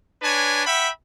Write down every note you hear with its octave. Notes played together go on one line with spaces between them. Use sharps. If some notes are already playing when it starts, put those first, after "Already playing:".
D4 B4 C#5 G#5
E5 F#5 G5 B5